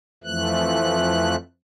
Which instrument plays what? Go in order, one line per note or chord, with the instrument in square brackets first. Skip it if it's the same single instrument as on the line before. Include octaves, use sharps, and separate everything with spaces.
[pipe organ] F2 E3 F3 A3 F#6